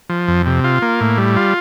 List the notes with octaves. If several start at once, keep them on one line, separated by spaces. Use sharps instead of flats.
F3
F2
C3
F4
A#3
A2
G3
F4